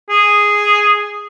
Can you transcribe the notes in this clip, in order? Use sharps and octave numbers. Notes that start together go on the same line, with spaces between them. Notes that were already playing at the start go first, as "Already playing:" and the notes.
G#4